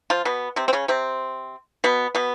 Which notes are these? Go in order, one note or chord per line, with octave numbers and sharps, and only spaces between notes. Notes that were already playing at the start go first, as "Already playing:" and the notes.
F3 F4
B2 B3
C3 C4
C4
C#3 C#4
C3 C4
B2 B3
B2 B3